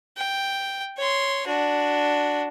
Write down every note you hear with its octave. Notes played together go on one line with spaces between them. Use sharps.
G5
C#5 C6
D4 F#4